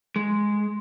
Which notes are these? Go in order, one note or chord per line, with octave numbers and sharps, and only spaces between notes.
G#3